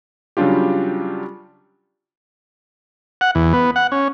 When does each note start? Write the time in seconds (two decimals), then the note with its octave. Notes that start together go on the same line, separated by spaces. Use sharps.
0.37 C#3 F#3 G3 D4 F4 G4
3.21 F#5
3.35 E2
3.53 B3
3.76 F#5
3.92 C#4